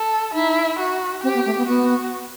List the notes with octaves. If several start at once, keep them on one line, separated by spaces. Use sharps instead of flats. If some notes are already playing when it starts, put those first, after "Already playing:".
Already playing: A4
D#4 E4
F#4
C4 G4
B3
A3
B3
B3 F#4